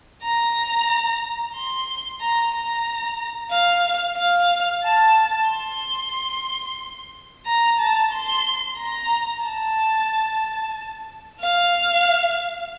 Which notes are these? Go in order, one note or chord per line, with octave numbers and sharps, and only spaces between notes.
A#5
C6
A#5
A#5
F5
F5
A5
C6
A#5
A5
C6
A#5
A5
F5